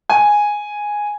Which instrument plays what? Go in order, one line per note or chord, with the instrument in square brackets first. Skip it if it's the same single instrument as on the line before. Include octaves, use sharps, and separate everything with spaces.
[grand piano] G#5